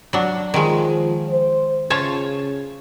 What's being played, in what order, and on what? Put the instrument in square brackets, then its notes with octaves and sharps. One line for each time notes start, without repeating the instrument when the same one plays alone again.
[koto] F#3 D4
[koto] D#3 G#3 [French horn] F3
[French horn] C5
[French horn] C#3 [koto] F4 C#5 A5